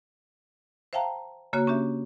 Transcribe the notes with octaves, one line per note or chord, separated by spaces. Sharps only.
C5 E5 F5 G5 A5 A#5
C#3 A#3 F#4 C#5
C#4 D4 G4 E5